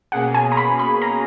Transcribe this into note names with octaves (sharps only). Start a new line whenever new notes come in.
B2 A#3 C#4 G#4 F#5
G#5
A#5
B5
B5
A#5